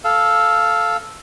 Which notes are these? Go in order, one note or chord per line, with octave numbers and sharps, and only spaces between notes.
A4 F5